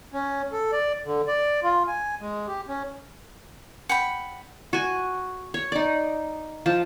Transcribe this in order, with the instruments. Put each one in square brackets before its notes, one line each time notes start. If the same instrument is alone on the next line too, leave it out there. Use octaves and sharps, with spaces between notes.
[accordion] C#4
A4
D5
D3
D5
F4
G#5
G#3
G4
C#4
[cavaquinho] F#5 G5 B5
[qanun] F#4 G#5
C#5
D#4 D5
F3 A5